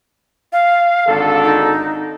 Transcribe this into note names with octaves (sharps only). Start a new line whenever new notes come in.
F5
G#1 D3 A4
D#4